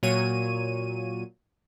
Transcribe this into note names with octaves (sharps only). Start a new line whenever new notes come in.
A#2 F#3 C#5 D#7